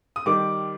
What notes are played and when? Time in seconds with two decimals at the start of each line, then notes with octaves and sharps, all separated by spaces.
0.16 D#6
0.26 D#3 G3 D6